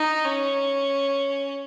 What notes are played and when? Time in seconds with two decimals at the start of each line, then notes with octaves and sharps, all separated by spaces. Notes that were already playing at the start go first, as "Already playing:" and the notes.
Already playing: D#4
0.25 C#4